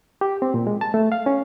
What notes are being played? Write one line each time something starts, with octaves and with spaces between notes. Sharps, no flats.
G4
C4
A#2
G#3
A5
A3
F5
C#4